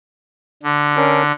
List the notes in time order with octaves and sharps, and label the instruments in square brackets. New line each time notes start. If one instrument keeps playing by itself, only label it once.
[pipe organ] D3
[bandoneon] C#4 D4 A#4